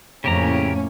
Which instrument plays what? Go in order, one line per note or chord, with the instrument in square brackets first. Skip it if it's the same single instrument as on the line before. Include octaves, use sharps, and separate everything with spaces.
[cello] F2 [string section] A2 A#3 C#4 [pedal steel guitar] C#3 G4 A#5